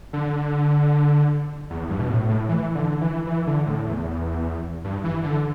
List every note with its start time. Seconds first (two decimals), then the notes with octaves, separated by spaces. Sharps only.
0.13 D3
1.70 E2
1.89 G2
2.00 B2
2.10 A2
2.29 A2
2.49 E3
2.75 D3
3.01 E3
3.27 E3
3.47 D3
3.66 A2
3.86 E2
4.84 G2
5.04 E3
5.23 D3